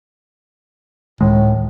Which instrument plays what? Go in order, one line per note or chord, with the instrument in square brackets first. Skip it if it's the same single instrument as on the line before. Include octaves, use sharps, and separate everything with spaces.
[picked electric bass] C#2 D#3 G#3 [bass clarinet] A2